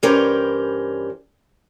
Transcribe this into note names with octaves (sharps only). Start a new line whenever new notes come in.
G2 E3 C#4 G4 A#4 C5